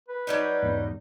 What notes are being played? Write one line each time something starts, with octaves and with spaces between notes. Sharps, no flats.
B4
F#3 G3 D#4
E2 G#2 B2